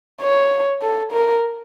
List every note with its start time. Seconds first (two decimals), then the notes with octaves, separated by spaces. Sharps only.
0.21 C#5
0.82 A4
1.12 A#4